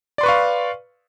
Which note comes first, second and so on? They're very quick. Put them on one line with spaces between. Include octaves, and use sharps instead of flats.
D5 C6 B4 C#6 F5